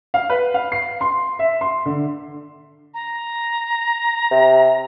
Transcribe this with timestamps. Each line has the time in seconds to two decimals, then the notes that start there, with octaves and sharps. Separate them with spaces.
0.14 F5
0.30 B4
0.54 F5
0.72 C7
1.01 C6
1.39 E5
1.61 C6
1.86 D3
2.94 A#5
4.31 C3